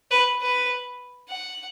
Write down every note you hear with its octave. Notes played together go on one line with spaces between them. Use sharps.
B4
B4
F#5